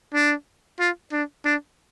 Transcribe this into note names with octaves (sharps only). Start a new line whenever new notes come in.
D4
F4
D4
D4